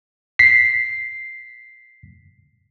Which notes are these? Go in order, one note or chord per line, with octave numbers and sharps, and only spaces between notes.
B6 C7